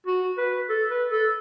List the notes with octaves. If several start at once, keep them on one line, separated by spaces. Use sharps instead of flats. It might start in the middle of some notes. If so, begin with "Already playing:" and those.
F#4
B4
A4
B4
A4